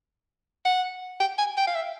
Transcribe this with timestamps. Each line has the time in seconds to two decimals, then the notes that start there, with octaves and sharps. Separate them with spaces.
0.65 F#5
1.20 G5
1.38 G#5
1.57 G5
1.67 F5
1.75 E5